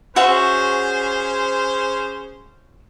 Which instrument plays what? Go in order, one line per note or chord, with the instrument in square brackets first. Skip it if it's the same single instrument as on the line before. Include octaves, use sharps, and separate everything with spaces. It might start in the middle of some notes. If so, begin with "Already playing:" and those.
[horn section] C#4 G#4 C5 [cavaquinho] F#4 C#5 E5